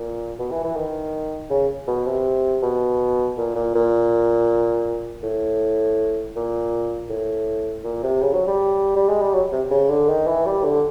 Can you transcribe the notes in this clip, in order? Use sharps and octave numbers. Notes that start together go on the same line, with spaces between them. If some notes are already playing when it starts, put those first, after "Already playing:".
Already playing: A#2
B2
E3
E3
D#3
C#3
B2
C3
B2
A#2
A#2
A#2
A2
A#2
A2
A#2
C3
C#3
F#3
G3
G3
G#3
G3
F#3
C3
C#3
D3
D#3
E3
G3
D3